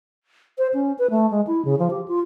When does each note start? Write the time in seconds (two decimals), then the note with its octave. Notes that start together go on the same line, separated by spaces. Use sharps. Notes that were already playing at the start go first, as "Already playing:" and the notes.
0.58 C5
0.74 C#4
0.99 B4
1.10 A3
1.31 G#3
1.47 E4
1.65 C#3
1.79 F3
1.90 G4
2.08 F4